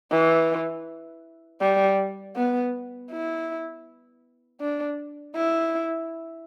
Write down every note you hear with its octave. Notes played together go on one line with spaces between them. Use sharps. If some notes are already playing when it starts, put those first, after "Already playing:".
E3
G3
B3
E4
D4
E4